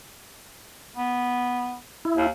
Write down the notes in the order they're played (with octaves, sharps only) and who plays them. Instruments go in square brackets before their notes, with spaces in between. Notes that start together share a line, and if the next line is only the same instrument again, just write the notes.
[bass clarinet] B3
[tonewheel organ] E4
[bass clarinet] D#2